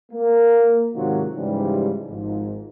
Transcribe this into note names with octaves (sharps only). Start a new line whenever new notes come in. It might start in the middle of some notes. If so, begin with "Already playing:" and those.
A#3
G#2 C3 D#3 F#3 F4 F#4
G#2 C#3 E3 F3 G3
G#1 G#2 F3